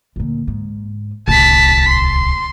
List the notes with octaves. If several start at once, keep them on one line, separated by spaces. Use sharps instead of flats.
D2 A#2
G#2
D1 C2 A5 B6
C6